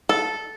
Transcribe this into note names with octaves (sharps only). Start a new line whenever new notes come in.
A4